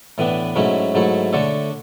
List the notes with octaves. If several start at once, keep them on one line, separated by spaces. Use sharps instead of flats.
A2 E3 B3 D4
G#2 F#3 A3 C#4 E4
G#2 F#3 A3 E4 A4
D3 A3 D4 A4 C#5